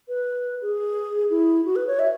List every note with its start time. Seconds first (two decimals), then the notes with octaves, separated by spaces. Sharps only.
0.08 B4
0.62 G#4
1.30 E4
1.65 F#4
1.76 B4
1.87 C#5
1.99 E5